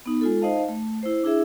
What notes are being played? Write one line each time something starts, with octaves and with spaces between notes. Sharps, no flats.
B3 D#4
G#3 F4 A4
D#4 C5 D#5 F5 A5
A3
E4 C5
D4 E4 G#4 E5